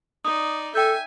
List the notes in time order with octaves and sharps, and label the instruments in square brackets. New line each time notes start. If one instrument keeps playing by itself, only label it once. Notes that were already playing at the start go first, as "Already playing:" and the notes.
[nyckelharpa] D#4 D5 [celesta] D#6
[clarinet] A4 [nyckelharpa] E5 G#5 [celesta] G5 G6